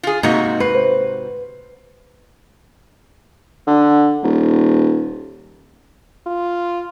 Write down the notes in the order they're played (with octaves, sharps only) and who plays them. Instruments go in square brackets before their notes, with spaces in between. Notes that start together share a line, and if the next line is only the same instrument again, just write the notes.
[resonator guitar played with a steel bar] F4 G#4
[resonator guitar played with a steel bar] G#2 C3 F#4 [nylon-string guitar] A#3 D#4
[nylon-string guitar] B4 [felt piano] C7
[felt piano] C5
[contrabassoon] D3
D#1
[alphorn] F4